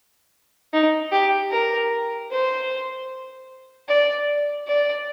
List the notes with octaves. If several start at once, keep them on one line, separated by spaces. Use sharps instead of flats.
D#4
G4
A#4
C5
D5
D5